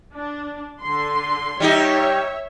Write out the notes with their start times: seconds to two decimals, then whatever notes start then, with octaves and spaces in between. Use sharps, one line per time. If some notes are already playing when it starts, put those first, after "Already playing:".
0.13 D4
0.81 D3 C6
1.60 G3 D#4 G4 C#5 E5